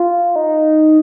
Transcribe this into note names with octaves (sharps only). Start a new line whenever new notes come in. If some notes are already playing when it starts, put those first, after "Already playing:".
Already playing: F4
D#4